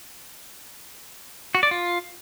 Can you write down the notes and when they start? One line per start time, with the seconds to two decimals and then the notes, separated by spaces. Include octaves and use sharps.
1.55 F#4
1.63 D5
1.71 F4